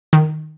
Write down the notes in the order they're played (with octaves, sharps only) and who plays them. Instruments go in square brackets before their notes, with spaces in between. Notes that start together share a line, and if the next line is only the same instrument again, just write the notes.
[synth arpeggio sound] D#3